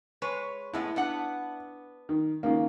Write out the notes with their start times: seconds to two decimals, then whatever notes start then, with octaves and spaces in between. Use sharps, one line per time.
0.22 G#3 B4 C#5
0.73 A2 G#3 B3 E4
0.96 B3 D4 F#5
2.09 D#3
2.43 C#2 D#3 A#3